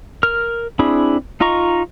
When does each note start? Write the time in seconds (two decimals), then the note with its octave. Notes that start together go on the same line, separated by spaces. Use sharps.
0.23 A#4 F6
0.79 C4 D4 E4 G#4 B5
1.40 D#4 F4 D#5 A#5 C#6